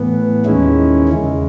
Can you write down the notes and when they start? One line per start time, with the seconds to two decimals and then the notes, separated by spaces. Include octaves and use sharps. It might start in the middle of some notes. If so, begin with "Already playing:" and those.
Already playing: A2 E3 B3
0.45 D#2 D#3 G#3 C#4 E4
1.09 E2 C#3 G#3